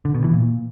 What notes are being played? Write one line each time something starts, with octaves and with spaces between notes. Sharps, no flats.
D3
B2
E3
A#2